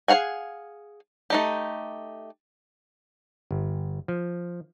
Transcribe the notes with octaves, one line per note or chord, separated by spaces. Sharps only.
G#4 C5 F5 F#5 G#5
A3 D#4 G4
G1
F3